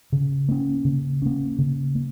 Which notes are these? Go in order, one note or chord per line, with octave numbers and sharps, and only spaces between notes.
C#3
A#3 C#4
C#3
A#3 C#4
C#3
A#3